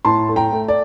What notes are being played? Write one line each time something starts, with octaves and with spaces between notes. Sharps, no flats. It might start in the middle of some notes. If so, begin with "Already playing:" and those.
A2 A5 C6
A3
G5 A#5
A3
D5